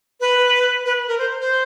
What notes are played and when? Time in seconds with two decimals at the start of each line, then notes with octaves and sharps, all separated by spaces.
0.20 B4
0.85 B4
1.08 A#4
1.18 C5
1.40 C5